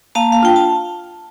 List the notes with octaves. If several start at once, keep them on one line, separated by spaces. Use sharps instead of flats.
A#3 F5 A5
F5
D4 F4 G5
A5